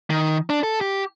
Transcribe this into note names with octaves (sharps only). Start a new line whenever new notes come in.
D#3
D4
A4
G4